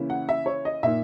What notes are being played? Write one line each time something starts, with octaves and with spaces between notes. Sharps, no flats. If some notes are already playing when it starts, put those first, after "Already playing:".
Already playing: C#3 E3 A#3 C#4 E4
F#5
E5
C#5
D#5
A#2 A#3 D#4 E5